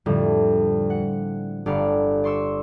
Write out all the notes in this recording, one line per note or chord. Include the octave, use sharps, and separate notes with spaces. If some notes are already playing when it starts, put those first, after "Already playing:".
F2 A2 D3 G3
F#5
G1 G2 D5 F5 F#5 B5
D5 C6 C#6 E6